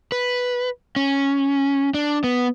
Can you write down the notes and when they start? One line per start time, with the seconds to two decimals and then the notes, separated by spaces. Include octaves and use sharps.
0.12 B4
0.96 C#4
1.94 D4
2.24 B3